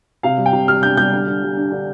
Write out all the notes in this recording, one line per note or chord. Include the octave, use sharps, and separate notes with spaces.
C3 F5
G3
G5
C3
G3 F6
D4 G6
G3 G6
D3
D3
G3
D4
D3